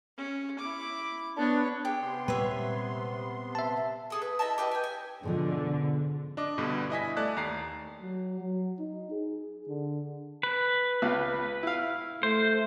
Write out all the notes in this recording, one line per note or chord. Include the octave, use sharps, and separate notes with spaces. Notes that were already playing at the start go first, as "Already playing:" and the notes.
C#4
E4 D6
B3 D4 C#5
G4 G#4
C3 B3 C6
A#2 G3 G#3 B4 C#5 E5
E5 A5
G#4 A4
B4
E4 D#5 E5 A5
G4 B4 D#5
G5 G#5
G#5
G#2 B2 D3 F3
D4 D#5 D6
G2 B2 D3 G3
E4 D#5 G#5 B6
A3 D5 A5 F#6
D#2 A#5 C7
F#3
F#3
D#4
G#4
D3
B4
C#2 F5
E4 F5
A3 C5